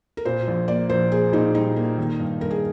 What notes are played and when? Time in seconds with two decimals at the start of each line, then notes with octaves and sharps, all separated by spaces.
0.17 A#4
0.25 A#2 C5
0.47 A#1
0.68 A#3 D5
0.89 A#1 C5
1.12 A#3 G#4
1.33 A#2 D#4
1.55 G3 D#4
1.76 A#3
1.98 D#3
2.19 G2
2.40 G2 A#4
2.51 G#4